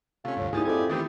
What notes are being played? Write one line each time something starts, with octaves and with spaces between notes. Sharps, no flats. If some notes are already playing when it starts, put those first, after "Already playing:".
C3 A3 C#4 F4
D2 G2 C#5
G#2 A#3 D#4 E4 G4 G#4 A6
F2 D5 G#6
D#3 E3 A3 B3 C4 G4